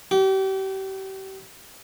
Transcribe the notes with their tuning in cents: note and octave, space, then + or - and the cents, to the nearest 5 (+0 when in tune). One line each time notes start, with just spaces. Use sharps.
G4 -35